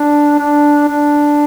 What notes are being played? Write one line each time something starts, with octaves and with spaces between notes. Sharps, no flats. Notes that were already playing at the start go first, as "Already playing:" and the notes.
Already playing: D4
D4
D4